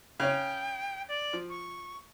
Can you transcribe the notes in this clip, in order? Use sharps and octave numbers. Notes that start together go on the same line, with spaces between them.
C#3 C#4 G5
D5
F3
C#6